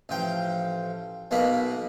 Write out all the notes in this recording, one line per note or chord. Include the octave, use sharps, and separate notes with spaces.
A1 F3 G5
B1 B2 A#3 D#5 B5